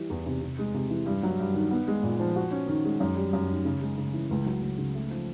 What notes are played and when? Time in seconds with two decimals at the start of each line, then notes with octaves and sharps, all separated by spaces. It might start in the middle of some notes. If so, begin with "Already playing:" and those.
Already playing: E3 G3
0.10 E2
0.26 C3
0.42 C3
0.59 G#3
0.74 C3
0.90 E3
1.06 G2
1.23 F#3
1.39 G2
1.54 D#3
1.71 B3
1.88 G#3
2.03 A#2
2.20 F3
2.36 F#4
2.51 C#4
2.68 D#3
2.85 G#3
3.00 F#2
3.16 G3
3.33 F#2
3.49 D#3
3.65 C#3
3.81 G#3
3.98 C#3
4.13 E3
4.31 C#2
4.46 F#3
4.62 C#2
4.78 C#3
4.95 A3
5.11 F3